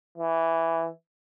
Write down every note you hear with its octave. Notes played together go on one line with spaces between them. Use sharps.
E3